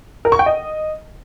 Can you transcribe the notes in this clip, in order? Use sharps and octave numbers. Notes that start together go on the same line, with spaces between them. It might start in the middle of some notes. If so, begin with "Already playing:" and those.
A#4
C#6
G5
D#5